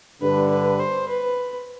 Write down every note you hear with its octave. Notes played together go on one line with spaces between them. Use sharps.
G2 D3 G3 B4
B4
C5
B4